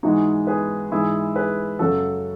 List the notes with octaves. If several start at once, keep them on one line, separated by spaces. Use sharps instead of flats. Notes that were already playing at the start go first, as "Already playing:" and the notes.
G#2 E3 G#3 D#4 F#4
G#4 B4
G#2 E3 G#3 E4 G#4
G#4 B4
F#2 C#3 F#3 F#4 A4